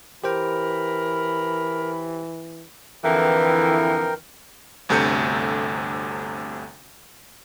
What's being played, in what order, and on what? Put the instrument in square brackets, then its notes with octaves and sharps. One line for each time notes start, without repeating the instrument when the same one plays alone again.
[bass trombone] E3 [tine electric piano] G4 C5 G5 [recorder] A#4 [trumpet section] B5
[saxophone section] F2 D3 E3 [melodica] A#4 G5
[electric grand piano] G1 D2 C3 A4 G6 C#7